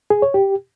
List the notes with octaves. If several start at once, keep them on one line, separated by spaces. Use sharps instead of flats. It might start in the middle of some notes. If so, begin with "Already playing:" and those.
G#4
C#5
G4